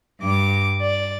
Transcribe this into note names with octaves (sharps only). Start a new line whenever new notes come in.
G2 D6
D5